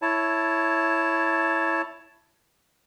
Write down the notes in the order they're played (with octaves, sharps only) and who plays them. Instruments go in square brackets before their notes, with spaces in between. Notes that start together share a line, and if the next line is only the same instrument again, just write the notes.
[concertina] E4 C#5 A5